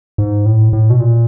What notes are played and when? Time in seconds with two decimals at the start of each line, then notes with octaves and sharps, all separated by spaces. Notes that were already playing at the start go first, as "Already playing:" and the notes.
0.18 G#2
0.45 A2
0.73 A2
0.90 B2
1.00 A#2